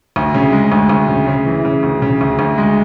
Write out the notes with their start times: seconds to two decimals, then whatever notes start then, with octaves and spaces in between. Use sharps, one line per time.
0.16 D2
0.34 C#3
0.52 G#3
0.72 D2
0.89 D2
1.08 C#3
1.27 C#3
1.46 E3
1.65 C#3
1.83 D2
2.02 C#3
2.21 D2
2.39 D2
2.58 G#3